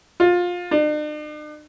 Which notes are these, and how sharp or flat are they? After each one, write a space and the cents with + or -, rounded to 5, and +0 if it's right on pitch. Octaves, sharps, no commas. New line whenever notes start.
F4 +20
D4 +45